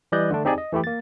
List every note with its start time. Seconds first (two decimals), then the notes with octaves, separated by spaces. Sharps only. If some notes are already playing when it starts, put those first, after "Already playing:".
0.12 E3 G3 D5 D#5 F#6 G6
0.30 D3 A3 D4
0.45 C4 D#4 G4 G#4 D5 G#5
0.58 D#5
0.72 E3 A3 E4 G4
0.84 A#3 A6